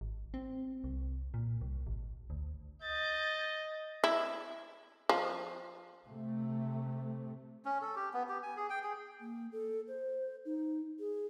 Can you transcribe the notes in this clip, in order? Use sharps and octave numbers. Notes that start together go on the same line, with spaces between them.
G#1
C4
C2
A#2
C2
G#1
D2
D#5 G6 A6
E4
F3
C3 A3
C#4
A4
G4
B3
G4
G#5
G#4
G5
G#4
A#3
A4
C5
D#4
G#4